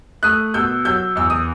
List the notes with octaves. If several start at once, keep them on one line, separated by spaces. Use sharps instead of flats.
A3 D#6 F#6
B2 E6 G6
F#3 E6 G6
E2 E6
D#6